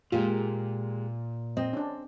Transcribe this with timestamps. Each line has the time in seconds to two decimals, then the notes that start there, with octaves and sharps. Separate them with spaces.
0.12 A#2 G#3 A#3 F4 G4
1.57 C4 D#5
1.73 C#4 D4